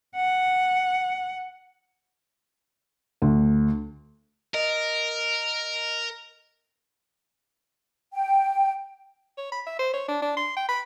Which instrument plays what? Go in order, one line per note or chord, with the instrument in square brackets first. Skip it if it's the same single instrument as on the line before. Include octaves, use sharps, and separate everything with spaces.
[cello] F#5
[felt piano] D2
[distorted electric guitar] A#4 [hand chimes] D#5
[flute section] G5
[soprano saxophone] C#5
B5
E5
C5
C#5
D4
D4
C6
G5
B5